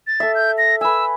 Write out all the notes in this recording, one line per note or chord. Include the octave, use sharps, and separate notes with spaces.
A6
A4 E5
G6
A#6
B4 G#5 E6